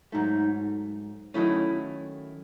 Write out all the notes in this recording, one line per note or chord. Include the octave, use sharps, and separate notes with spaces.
G#2 F#3 A3 D#4
D#3 F#3 A3 C#4 E4